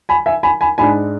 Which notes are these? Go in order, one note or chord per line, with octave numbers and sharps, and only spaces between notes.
G#5 B5
E5 G#5
G#5 B5
G#5 B5
G#2 G#3 D4 G#5 B5